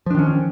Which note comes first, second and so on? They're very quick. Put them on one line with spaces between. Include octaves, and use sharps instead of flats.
F3 D4 D#3 C#4